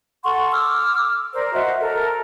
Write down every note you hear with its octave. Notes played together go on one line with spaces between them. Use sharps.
A4 F#5 C6 C#6
D6 E6 F6
A#4 C5 D5
F#4 C5 D#5 E5
A4 A#4